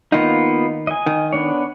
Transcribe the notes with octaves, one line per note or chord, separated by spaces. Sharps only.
D#3 A#3 B3 D#4 F4
D#5 G#5
D#3
B3 D4 C#5